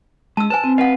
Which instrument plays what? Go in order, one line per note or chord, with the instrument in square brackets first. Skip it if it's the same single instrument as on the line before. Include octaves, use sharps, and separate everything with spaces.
[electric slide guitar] G#3 [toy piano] A5 E6
[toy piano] B4 C5 G#5 [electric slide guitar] A5
[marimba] C4
[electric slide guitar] B4 F5 [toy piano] D#5 F#5